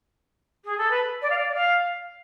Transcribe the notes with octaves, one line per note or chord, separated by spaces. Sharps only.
G#4
A4
B4
D5
F5
D5
D5
F5